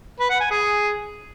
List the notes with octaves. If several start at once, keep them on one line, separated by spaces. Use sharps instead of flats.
B4
F#5
G#5
G#4